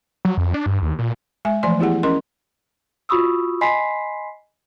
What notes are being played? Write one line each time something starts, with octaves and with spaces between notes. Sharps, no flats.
F#3
F2
D4
G2
D#2
A#2
G#3 E5 G#5
E3 F3 A3 D5 G#5 C6
B3 E4 G4 G#4 F#5
C#4 A#4 D#5 C6
F4 F#4 B5 C#6 D#6 E6
D#5 G#5 B5 C6 B6 C7